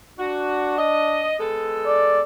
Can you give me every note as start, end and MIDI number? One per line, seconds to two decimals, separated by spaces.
0.19 1.36 62
0.19 0.75 66
0.78 1.35 75
1.40 2.21 56
1.40 2.21 59
1.40 2.21 69
1.86 2.23 74